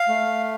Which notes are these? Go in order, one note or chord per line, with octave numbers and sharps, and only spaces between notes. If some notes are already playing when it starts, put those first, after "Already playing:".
Already playing: F5
A3